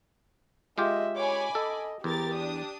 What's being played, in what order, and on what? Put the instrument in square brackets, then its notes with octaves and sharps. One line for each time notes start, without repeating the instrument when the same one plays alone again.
[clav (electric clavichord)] G#3 F4 G4 [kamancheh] D#5 E5
[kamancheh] C#5 [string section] G#5 B5 D6
[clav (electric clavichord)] A4 [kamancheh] D#5
[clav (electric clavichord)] E2 [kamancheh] G4 [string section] A#4 A6
[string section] D4 D#6